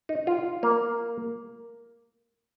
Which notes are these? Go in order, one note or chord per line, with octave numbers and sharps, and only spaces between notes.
D#4
F4
A#3